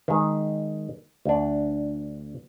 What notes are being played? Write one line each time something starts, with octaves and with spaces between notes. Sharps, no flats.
D#3 G#3
D2 D4